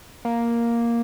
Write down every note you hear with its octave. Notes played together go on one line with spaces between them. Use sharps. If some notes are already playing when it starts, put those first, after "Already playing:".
A#3